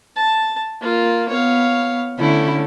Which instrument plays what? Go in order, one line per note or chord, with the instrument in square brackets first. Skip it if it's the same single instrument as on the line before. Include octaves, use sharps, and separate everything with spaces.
[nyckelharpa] A5
A#3 F4
[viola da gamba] B3 [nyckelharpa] C#5 F5
[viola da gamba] D3 C#4 E4 [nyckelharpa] A3